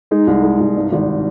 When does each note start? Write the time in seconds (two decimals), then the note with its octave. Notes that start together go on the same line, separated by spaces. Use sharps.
0.11 G#3 D#4
0.27 C2
0.43 G#3
0.60 C2
0.76 G2
0.92 G#1